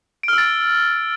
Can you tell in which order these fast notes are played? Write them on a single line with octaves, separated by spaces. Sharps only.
D7 F6 E6 A6